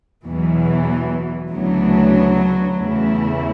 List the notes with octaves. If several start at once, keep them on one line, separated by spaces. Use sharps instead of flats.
E2 B2 E3 F#3
D2 C#3 E3 F#3 B3 D4
E2 C#3 E3 A3 E4